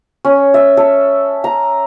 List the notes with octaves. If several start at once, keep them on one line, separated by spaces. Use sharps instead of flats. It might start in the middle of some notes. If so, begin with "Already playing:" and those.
C#4
E5
A4
A#5